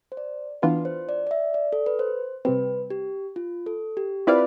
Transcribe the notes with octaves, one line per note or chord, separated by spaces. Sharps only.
C5
D5
E3 B3 D4 F4 B4
C5
D5
D5
E5
D5
A4
B4
C5
C3 G3 C4 B4
G4
F4
A4
G4
C4 E4 F4 B4 D5 F5